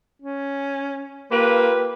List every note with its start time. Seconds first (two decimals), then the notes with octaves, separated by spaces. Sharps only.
0.22 C#4
1.32 A#3 F4 G4 B4